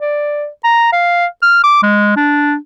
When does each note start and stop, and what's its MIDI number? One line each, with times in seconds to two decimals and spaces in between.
0.01 0.47 74
0.64 0.89 82
0.93 1.26 77
1.43 1.61 89
1.64 1.82 86
1.83 2.13 56
2.16 2.55 62